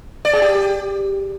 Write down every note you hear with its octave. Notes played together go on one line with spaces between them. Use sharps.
D5
G#4
G4